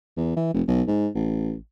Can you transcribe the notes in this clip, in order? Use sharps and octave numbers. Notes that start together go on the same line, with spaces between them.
E2
E3
F1
B1
G#2
A1